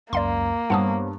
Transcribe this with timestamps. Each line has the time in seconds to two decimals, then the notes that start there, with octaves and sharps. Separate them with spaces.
0.13 C#2 F#2 A#3 D5 F5 C6
0.70 G2 B3 C5 C#5 F#5 A5 D#6